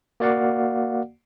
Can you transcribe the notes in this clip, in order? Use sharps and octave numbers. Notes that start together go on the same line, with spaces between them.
A#3 F#4 D5 F5 F#5